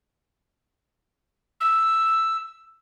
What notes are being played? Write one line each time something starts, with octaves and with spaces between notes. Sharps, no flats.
E6